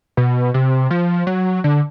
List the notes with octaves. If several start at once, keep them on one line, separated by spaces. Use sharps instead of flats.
B2
C3
F3
F#3
D3